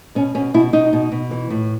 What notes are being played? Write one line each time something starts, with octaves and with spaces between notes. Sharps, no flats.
B2 C#4
B2 C#4
B2 E4
B2 D#4
B2
B2
E3
A2